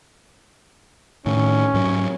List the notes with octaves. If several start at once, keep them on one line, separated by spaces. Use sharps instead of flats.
A2 D#3 C#4
G#2 F#3